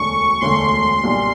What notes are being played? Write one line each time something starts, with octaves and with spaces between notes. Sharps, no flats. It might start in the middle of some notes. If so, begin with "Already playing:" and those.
Already playing: E1 D2 D3 C#6
E1 D2 D3 C6
B1 A#2 G3